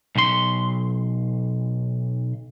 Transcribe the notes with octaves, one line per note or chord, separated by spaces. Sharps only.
B1 C6